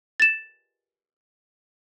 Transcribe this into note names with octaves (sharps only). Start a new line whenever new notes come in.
A6 E7